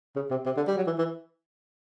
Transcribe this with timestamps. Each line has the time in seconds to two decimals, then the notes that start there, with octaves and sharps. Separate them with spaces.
0.16 C#3
0.31 C3
0.46 C3
0.57 D3
0.67 G3
0.77 F#3
0.87 E3
0.98 E3